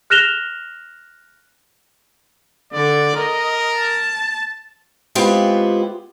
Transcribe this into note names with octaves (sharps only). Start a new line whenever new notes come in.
F6 F#6 A#6 E7 F7 G7
D3 D5
A#4 D#5
A5
G#3 B3 C4 E4 F4 G4